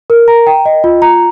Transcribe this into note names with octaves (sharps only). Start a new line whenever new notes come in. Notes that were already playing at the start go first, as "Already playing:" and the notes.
A#4
A#5
G5
D#5
F4
A#5